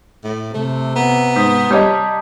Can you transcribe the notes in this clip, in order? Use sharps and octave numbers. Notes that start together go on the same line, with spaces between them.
A2
C3 A3
B3 A#5
G#2 D#6 G6 B6
G3 C#5 D#5 A5 D6 G6